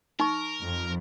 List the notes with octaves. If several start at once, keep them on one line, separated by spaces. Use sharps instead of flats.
D#4 A#4 C#6
F2